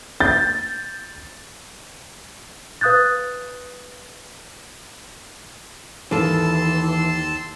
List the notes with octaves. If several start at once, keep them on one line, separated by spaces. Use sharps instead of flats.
G6 A6
B4 F5 D#6 F#6 G6 A6
D#2 E3 A4 A5 C6 E6